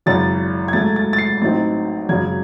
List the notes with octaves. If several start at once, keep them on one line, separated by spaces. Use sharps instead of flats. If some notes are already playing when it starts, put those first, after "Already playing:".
G#1 F#2 C#3 E3 A6
G#6
G#2 F#3 A3 A6
A6
A6
C7
A1 A2 F#3 C4 D#4 A6
G#1 F#2 C#3 F#3 C#4 G#6